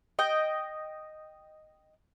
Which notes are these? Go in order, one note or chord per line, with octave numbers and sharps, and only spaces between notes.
D#5 G5